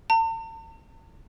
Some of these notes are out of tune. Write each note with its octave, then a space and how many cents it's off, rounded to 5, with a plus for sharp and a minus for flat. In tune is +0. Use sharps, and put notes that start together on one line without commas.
A5 +45